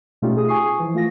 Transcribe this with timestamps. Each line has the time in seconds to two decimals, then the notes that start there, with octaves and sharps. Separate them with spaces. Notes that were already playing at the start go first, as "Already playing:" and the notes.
0.22 B2 A3 C#4 D#4 F4 G4
0.36 F4 G#4 D#6
0.48 G#5 C#6 D#6 C7
0.79 E3 F3
0.94 A3 F4 A#6